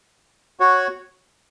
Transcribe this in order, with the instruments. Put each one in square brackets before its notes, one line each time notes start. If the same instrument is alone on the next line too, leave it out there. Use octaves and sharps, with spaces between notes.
[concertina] F#4 C#5 F#5